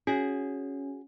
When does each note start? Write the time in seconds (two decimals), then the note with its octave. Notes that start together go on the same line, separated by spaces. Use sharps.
0.07 C#4 F#4 G#4